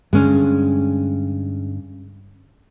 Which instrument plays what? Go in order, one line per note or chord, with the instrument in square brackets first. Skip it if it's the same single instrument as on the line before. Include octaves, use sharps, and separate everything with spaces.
[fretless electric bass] G2 D3 [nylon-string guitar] G#3 C#4